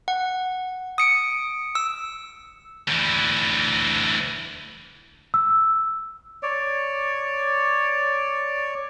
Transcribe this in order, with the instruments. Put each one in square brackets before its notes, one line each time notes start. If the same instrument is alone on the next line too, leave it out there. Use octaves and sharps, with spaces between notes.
[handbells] F#5
D#6 C#7 D7
E6
[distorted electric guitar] D2 E3
[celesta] E6
[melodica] C#5 D5